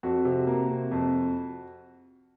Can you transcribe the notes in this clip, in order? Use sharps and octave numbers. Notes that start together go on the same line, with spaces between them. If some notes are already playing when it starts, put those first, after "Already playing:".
F2 F#4
C3
A#3
C3
F2